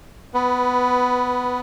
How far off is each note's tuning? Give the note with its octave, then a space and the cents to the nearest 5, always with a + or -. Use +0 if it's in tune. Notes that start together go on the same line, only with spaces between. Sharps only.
B3 +15 B4 -5